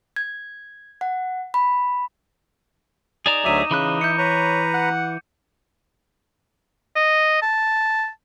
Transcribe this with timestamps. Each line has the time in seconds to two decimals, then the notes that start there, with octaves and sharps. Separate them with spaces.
0.16 G#6
1.01 F#5
1.54 B5
3.26 D#4 G#4 D5 A#5 E7
3.45 D2 F#3 E5 D6 D#7
3.71 C#3 E3 B5 F#6
4.01 E4 G6 C#7
4.18 B4 C#5 A#5
4.74 F#5
6.96 D#5
7.42 A5